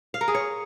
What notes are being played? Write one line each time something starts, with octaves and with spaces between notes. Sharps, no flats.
F5
A#4
G#4
C#5